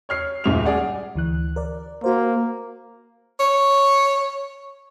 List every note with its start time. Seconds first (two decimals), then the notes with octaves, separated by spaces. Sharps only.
0.09 C#5 F6 C7
0.44 D#1 C#2 F7
0.66 G#4 D5 F#5
1.16 D2 E3 F#6
1.56 A#4 D5
2.04 A#3 F#4 C5
3.40 C#5